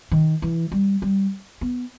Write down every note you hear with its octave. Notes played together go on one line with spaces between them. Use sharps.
D#3
E3
G3
G3
B3